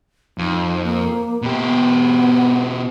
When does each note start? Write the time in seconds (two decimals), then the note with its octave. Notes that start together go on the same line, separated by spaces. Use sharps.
0.38 F2 D#4
0.83 A#3
1.42 B2 G4
1.61 B3